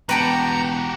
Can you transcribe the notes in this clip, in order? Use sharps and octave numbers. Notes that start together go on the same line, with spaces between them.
E1 F#4 G4 B4 G5 A5 A#5